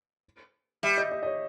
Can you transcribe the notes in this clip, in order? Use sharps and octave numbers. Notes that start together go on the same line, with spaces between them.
G3 E5
D#5
D#5
D#5
C#5